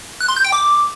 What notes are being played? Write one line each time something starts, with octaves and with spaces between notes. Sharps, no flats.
F#6
C6
G6
G5
D6